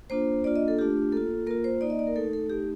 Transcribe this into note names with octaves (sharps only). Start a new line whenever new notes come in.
A#3 D4 F4 C5
A#3 D4 F4 D5
D#5
A4
A3 D4 F4 G4
A#3 F4 A4
A#3 F4 A#4
C5
A#3 D#4 D5
D#5
D5
A#4
A3 D#4 A4
A4
A3 D#4 G4